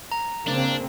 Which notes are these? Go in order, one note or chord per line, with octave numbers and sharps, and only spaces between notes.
A#5
C#3 A#3 C4 D4